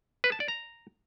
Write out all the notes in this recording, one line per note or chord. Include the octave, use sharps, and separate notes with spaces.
B4
A5
D5
A#5